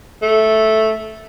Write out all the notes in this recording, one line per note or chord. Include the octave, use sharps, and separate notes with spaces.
A3